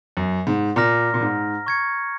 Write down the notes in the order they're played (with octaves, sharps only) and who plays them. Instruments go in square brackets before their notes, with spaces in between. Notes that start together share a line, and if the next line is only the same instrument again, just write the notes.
[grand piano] F#2
G#2
[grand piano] A#2 [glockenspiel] A#5 F6 A#6
[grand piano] A#2
G#2
[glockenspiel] C#6 G#6 C#7